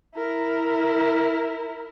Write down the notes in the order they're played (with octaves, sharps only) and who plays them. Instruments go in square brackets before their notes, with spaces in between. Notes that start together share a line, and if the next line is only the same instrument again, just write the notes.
[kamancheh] E4 A#4